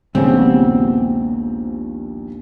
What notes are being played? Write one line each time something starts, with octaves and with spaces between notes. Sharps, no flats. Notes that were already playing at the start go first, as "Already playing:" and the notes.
A#1 D#2 A#2 C#3 G#3 B3 C4 G4